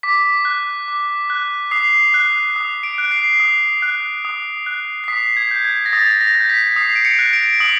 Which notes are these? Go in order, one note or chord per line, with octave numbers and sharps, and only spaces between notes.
D6 B6
F#6
D6
F#6
D#6 C7
F#6
D#6
D7
F#6
C7
D#6
F#6
D#6
F#6
C7
D#6 B6
G#6
G6
G#6
A#6
D#6 A6
A#6
G6
B6
D#6 C7
D7
C#7
F#6
D7
D#6 F#7